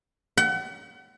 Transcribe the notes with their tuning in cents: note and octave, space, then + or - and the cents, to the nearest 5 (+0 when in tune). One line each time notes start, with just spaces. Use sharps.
F#5 +40